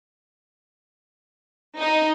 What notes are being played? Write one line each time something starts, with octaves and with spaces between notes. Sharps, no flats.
D#4